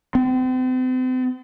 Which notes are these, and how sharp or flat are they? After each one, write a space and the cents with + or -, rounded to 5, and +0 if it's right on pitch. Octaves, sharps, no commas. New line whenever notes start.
C4 -40